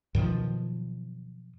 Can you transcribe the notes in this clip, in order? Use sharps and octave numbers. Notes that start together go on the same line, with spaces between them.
F#2 B2 D#3 F3